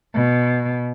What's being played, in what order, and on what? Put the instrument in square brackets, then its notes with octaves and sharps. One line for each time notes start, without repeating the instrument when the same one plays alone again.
[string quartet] B2